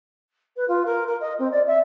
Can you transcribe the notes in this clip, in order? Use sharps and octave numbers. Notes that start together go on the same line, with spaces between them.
B4
F4
A#4
A#4
D#5
C4
D5
E5